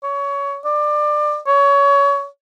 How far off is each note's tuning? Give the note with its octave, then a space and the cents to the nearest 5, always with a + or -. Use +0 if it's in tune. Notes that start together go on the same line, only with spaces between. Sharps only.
C#5 +20
D5 +25
C#5 +25